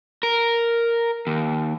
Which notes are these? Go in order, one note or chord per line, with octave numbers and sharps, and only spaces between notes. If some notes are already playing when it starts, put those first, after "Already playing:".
A#4
D#2